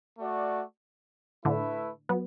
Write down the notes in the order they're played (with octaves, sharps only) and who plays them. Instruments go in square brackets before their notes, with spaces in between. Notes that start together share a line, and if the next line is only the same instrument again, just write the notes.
[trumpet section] A3 F#4 D5
[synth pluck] A2 D3 [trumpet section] A3 E4 B4 E5
[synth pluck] F#3 B3